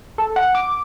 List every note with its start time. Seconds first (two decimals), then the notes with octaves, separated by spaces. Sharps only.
0.18 A4
0.36 F#5
0.55 D6